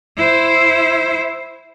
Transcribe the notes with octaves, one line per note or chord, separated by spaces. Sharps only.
E4 C5